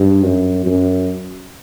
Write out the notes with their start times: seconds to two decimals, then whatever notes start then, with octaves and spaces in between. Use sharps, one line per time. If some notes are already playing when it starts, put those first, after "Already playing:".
Already playing: G2
0.23 F#2
0.66 F#2